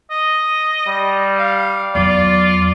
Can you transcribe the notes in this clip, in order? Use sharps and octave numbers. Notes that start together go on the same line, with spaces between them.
D#5
G3
F5
E2 F#3 F4 D5